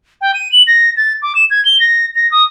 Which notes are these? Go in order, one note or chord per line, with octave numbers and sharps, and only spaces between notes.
G5
D#7
F#7
A#6
A6
D6
E7
G#6
G7
A#6
A#6
D#6